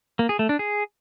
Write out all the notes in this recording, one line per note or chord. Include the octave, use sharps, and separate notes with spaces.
A#3
G#4
A3
D4
G#4